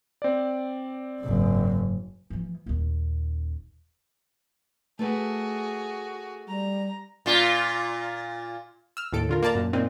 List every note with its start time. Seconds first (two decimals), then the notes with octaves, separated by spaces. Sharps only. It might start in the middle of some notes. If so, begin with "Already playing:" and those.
0.22 C4 D5
1.20 F#1 G#2
2.30 E3 F3
2.66 D#1 D#2
4.99 A3 F#4 G#4 A4 B4
6.48 G3 A#5
7.26 A#2 F4
8.97 E6 F6
9.13 D#2 A2 A4 D7
9.29 D3 F4 A#4
9.43 A#3 D5 A5 A#5
9.55 F#2 A#2
9.73 A#2 C4 D#4